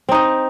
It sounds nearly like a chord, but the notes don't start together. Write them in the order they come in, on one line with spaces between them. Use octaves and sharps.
C4 D#4 D#5